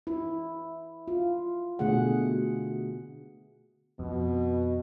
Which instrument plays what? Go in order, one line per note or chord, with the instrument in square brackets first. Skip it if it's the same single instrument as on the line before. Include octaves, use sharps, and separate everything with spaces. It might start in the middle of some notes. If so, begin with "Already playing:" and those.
[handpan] E4
F4
B2 D3 A3 G#4 F#5
[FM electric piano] F2 [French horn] B2